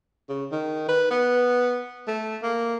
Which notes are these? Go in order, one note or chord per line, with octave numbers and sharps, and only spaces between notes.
C#3
D#3
B4
B3
A3
A#3